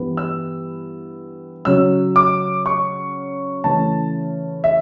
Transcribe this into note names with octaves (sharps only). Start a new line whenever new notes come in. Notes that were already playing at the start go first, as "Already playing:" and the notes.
Already playing: G2 E3 G3 B3
E6
C#3 F#3 C#4 E6
D6
C#6
C#3 E3 A3 C#4 A5
E5